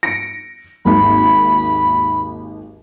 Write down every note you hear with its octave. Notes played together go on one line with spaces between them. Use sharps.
A#6 C#7 D7
G#1 D#2 B5